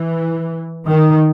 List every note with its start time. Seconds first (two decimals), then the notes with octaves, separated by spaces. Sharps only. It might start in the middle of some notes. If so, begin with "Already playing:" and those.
Already playing: E3
0.86 D#3